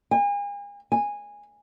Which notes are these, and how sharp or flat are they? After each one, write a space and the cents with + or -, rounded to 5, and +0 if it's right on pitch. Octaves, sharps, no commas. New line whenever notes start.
G#5 -40
G#5 -15